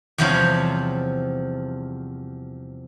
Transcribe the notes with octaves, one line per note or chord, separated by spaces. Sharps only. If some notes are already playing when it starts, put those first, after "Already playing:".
E2 C3 F3 G3 C5 C#5